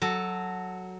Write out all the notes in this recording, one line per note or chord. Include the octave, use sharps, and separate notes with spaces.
F#3 A4